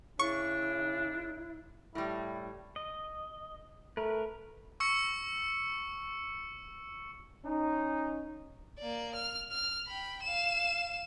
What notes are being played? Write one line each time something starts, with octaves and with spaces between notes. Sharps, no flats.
C#3 D4 E4 C#6
A2 G3 E4
D#5
A3 A#4 B4
C#6 E6 C#7
C#4 D#4
A#3 D5
F6
F6
G5 B5
F5 E7